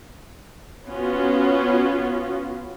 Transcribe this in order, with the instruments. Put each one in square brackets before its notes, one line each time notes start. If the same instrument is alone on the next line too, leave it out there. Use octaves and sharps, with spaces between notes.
[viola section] B3 C#4 F4 F#4